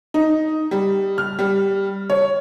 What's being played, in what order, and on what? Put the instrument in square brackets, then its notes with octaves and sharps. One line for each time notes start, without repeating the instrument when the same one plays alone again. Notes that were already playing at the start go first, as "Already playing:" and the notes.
[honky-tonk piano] D#4
G3
F6
G3
C#5